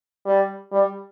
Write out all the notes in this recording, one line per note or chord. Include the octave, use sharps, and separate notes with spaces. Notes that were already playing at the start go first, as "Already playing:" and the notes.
G3
G3